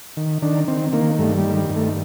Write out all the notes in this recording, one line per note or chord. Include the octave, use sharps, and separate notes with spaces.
D#3
D#3 D4
D#3 C4
D#3 A#3
G2 A3
G3
D#3
G3
G2
A3